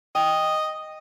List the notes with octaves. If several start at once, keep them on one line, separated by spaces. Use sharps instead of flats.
D#5 G5